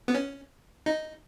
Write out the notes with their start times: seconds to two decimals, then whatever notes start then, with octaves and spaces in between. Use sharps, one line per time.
0.08 B3
0.15 C#4
0.86 D#4